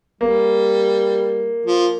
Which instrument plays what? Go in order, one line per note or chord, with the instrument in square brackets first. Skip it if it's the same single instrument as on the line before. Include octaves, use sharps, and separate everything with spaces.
[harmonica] G3 [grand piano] A#3
[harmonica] F3